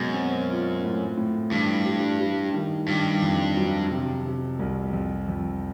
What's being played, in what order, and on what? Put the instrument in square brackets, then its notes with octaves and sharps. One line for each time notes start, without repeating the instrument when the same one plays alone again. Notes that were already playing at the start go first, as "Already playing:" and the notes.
Already playing: [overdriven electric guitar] F#2 [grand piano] B2 G#3
[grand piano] C4
F4
A2
A2
[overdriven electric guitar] G2 [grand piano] E3
[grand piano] G3
G3
D#3
[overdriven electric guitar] G2 [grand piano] D#3
[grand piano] F2
F#3
C3
C3
C2
F2
F2